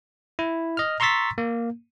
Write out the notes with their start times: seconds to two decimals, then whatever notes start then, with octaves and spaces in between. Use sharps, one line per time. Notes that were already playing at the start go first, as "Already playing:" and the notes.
0.39 E4
0.77 D#5 F6
1.00 A#5 C6 C#6 E6 A6 B6
1.38 A#3